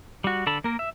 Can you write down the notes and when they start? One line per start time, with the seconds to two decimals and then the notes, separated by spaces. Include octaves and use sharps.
0.24 G3 F#4
0.47 D3 A4 A5 B5
0.64 A#3 A#4
0.79 E5